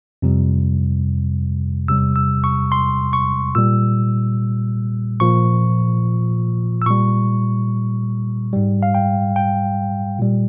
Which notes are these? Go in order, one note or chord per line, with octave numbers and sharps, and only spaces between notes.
F2 C3 G3
E2 C3 G3 E6
E6
C#6
C6
C#6
A#2 G3 E6
A#2 F3 C#6
E6
A#2 G3 C#6
G#2 G3
F5
G5
G5
A#2 G3